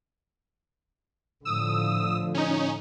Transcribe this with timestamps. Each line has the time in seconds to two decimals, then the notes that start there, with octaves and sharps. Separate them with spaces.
1.45 A2 D3 F3 D#6 E6
2.34 C#4 D#4